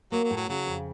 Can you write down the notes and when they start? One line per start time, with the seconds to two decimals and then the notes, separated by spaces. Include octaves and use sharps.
0.12 F#3 A#3
0.24 F#3
0.31 A2
0.37 F#3
0.49 C#3 F#3
0.67 F2